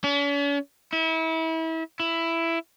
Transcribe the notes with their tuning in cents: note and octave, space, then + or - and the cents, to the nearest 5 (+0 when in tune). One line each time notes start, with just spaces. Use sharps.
C#4 +45
E4 -30
E4 +10